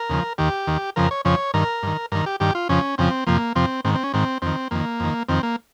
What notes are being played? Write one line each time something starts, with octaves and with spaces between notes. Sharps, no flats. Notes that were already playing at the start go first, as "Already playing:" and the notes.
Already playing: A#4
D#2 C#3 F3
D#2 D#3 G4
D#2 D#3
F2 C#3 F3 A#4
C#5
F2 C#3 F3 C#5
G2 D#3 A#4
G2 D#3
G2 D#3 A#4
G4
G2 D#3 G4
F4
F2 C#3 F3 C#4
F2 C#3 F3 C4
F2 C3 F3 A#3
F2 C3 F3 C4
G#2 D#3 C4
C4
C#4
G#2 D#3 C4
F2 D#3 C4
F2 D#3 A#3
F2 D#3
F2 D#3 C4
A#3